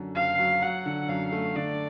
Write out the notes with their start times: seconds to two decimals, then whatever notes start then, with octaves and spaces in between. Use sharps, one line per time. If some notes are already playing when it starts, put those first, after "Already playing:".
Already playing: F#2 D3
0.15 F#1 F5
0.39 F#3
0.62 F#3 F#5
0.86 D3
1.09 F#2 F5
1.32 A3
1.56 D3 D5